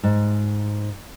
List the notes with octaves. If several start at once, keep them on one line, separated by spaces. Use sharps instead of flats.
G#2